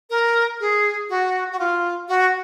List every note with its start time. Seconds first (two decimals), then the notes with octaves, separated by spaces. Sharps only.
0.10 A#4
0.60 G#4
1.09 F#4
1.52 F#4
1.59 F4
2.08 F#4